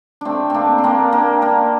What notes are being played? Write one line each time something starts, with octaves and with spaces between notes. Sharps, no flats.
A3 C4 D4
A#3 C4 D4
C4
A#3 D4
A#3 D4
A#3 D4